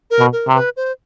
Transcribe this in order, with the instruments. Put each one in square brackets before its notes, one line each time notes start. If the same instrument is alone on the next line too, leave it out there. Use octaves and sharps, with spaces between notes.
[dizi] A#4
[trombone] B2
[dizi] A#4
[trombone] C3
[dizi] B4
C5